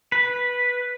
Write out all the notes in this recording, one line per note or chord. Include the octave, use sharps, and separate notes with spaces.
B4